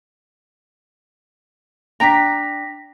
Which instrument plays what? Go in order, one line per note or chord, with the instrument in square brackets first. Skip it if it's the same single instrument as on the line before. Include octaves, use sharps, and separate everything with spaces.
[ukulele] D4 G5 A#5 [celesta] A#6 B6